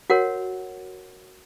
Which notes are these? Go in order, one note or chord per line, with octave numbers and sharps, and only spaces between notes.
F#4 A#4 C#5 F#5